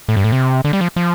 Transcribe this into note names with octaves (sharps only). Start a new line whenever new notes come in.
A2
G2
A2
C3
D3
G3
F3
F3